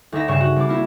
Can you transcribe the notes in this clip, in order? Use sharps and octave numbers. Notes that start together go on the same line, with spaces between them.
D2 D#4 E5 A#6
G2 C#3 C#5 C#6 E7
F#4
C2 D6
A#3 E4